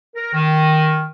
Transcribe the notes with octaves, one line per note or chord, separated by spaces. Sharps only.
A#4
D#3